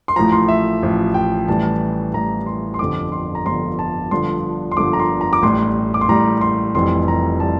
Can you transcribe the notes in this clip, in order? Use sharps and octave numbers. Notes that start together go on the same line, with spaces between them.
C6
A1 A2 F3 A#5
C6
E5
A1 A2 F3
G5
A1 A2 E3 G3 A5
A1 A2 E3 G3 A#5
C6
C6
G1 F2 D3 G3 D6
C6
A#5
G1 F2 D3 G3 C6
A5
G1 G2 D3 F3 C6
C6
G1 G2 D3 F3 D6
A#5
C6
A#5
D6
A1 A2 G3 C6
D6
C6
A1 A2 G3 A#5
C6
F1 F2 E3 G3 C6
A#5
E3 G3 A5